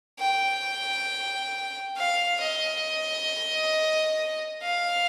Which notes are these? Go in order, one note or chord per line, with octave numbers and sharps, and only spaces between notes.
G5
F5
D#5
F5